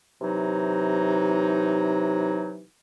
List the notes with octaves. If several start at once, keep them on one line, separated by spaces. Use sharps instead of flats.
C3 E3 F#3 D#4